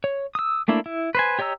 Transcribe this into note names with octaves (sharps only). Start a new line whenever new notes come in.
C#5
D#6 E6
A3 A#3 D4 E4
E4
B4 C5 G#5
G4 C#5 D#5 A#5 E6